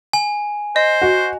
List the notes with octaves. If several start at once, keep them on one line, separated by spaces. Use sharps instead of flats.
G#5
C5 D#5
F#4